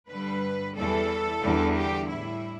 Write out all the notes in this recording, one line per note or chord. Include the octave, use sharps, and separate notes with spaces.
G2 D3 G3 B4
E2 E3 G3 A4
E2 D3 G3
G4
A2 G3 E4